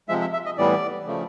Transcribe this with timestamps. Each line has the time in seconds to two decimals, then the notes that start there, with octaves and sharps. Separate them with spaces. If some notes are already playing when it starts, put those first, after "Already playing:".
0.09 C3 F3 G#3 E5
0.21 E5
0.33 E5
0.46 D#5
0.58 A2 E3 G3 B3 D5
1.06 C#3 F3 A3